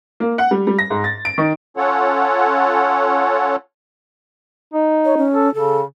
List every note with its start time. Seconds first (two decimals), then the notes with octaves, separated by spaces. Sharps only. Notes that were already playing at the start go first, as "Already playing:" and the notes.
0.20 A#3
0.38 F#5
0.51 G3
0.67 G3
0.79 A#6
0.90 G#2
1.04 A6
1.25 D7
1.38 D#3
1.77 C#4 F4 A4 C#5 F#5
4.74 D#4
5.05 C#5
5.18 C#4
5.34 A4
5.54 C#3 A4